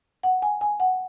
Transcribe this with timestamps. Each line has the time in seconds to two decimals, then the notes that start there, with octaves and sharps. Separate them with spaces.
0.23 F#5
0.42 G#5
0.61 G#5
0.80 F#5